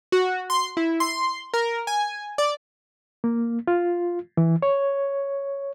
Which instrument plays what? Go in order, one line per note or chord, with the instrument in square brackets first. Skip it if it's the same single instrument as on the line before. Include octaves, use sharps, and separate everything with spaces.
[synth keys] F#4
C6
E4
C6
A#4
G#5
D5
[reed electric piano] A#3
F4
E3
C#5